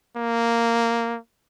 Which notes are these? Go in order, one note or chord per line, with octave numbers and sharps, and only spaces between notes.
A#3